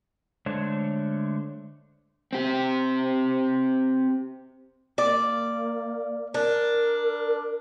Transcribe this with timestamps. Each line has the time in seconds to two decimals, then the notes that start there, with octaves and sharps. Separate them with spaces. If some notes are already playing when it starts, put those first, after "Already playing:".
0.46 D3 G#3 A3 D4 C5 C#5
2.33 C4 G4
4.98 A#3 D5
6.34 D4 A#4